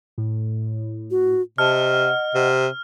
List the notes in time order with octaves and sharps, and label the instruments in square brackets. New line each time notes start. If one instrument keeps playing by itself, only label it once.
[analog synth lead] A2
[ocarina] F#4
[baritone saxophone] C3 [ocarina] D#5 [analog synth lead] A5 [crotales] F6
[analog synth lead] F#5
[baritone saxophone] C3